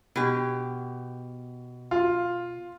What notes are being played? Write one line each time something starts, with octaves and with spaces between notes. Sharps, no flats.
B2 G4
F4